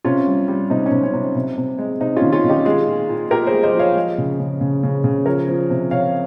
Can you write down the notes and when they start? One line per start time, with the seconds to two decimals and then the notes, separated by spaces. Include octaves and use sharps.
0.04 C3 C#4 F4
0.27 G3
0.48 G3
0.70 C3 D#4
0.86 C#4
0.91 C3
1.03 C#4
1.14 C3
1.35 C3
1.57 C3
1.79 G#3
2.00 C3 D#4
2.16 C#4 F4
2.22 D#3
2.33 C#4 F4
2.44 D#3
2.49 D#4 G4
2.65 G#3 F4 G#4
2.87 A#2
3.09 A#2
3.30 A#2 G4 A#4
3.47 G#4 C5
3.53 G#3
3.63 C5 D#5
3.74 F3
3.79 C#5 F5
3.95 G#3
4.18 C#3
4.40 C#3
4.61 C#3
4.83 C#3
5.04 C#3
5.26 F3 A#4 C#5
5.48 F3
5.70 C3
5.91 C3 C#5 F5